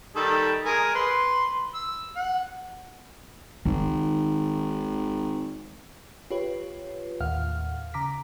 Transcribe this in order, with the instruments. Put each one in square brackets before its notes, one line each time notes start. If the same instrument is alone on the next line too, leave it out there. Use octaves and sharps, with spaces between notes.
[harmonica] D#3 G3 A4
G#3 A#4 G#5
B4 C6
E6
F#5
[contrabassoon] G#1 [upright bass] D#3 D#4
[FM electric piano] F4 G4 B4 C#5
D#2 A2 F5 F#5 F6
C#3 A#5 D6 B6